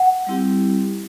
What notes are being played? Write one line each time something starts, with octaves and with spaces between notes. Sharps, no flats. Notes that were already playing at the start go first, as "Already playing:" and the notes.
Already playing: F#5
G3 C4 E4 G4